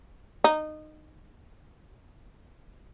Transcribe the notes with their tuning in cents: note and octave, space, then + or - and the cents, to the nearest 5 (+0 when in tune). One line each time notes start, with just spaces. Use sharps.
D#4 -20